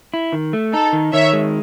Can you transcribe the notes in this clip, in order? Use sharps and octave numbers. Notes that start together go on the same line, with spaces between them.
E4
D#3
A3
D#4 A4
D#3
D#3 C#5 E5
G#3